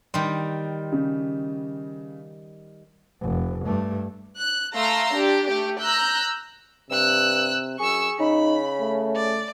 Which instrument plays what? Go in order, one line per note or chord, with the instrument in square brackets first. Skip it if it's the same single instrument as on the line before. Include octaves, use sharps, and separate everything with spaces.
[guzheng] D#3 G3 [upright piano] C6
[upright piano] C#3
[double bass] F1
G2 A3
[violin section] F#6
A3 F5 A#5 C6 E6
D4 G4
A3 G4
A#5 E6 F#6 G6
[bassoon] G2 [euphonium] C3 [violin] E6 F#6
[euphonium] F#2 [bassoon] G#4 [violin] C#6 E6
[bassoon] C#3 [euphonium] D#4 [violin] B5
[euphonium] A3
[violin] D5